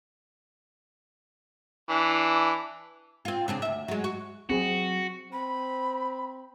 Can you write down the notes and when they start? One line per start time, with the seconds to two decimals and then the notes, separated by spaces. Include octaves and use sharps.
1.89 E3 D4
3.25 C4 F4
3.48 C#3 C4 D4
3.62 D2 E5
3.88 F#3 G#3
4.04 F#4
4.50 F#3 C4 F#4 G#4
5.32 C4 B5